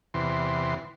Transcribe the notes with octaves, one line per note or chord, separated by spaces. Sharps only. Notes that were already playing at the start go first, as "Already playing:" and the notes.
E2 C3 E3 C6